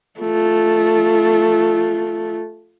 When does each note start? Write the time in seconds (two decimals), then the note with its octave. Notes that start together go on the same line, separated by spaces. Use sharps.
0.20 A3 F4